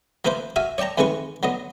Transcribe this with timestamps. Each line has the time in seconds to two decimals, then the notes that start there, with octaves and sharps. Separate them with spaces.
0.25 F3 A#3 E4 B4 C5
0.56 F#4 E5 F5 G#5
0.78 C#5 D5 G5 A5 A#5
0.98 F2 D#3 E3 G#3 B4 C#6
1.43 D3 F#3 B3 D#5